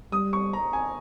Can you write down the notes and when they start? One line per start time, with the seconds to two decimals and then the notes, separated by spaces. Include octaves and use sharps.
0.12 G3 D#6
0.33 C#6
0.53 A#5
0.73 G#5